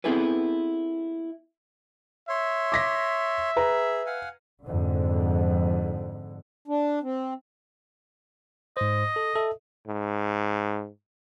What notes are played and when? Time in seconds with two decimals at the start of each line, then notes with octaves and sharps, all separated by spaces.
0.04 B3 C4 E4 G#4 A4 B4
2.29 C#5 E5 C6
2.72 D6 A#6 B6
3.57 G#4 B4 A#5
4.06 F5 F#5 G#5
4.64 F2 G#2 D3
6.68 D4
7.03 C4
8.77 G#2 C5 D#5
9.16 A4
9.36 A4 E5
9.88 G#2